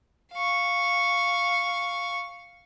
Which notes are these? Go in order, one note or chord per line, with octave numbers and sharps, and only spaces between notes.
F5 C#6